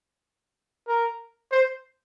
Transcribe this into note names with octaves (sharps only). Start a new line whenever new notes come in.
A#4
C5